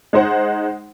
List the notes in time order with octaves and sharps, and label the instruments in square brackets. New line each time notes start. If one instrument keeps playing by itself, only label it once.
[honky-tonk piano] G#3 D#4 C5 F#5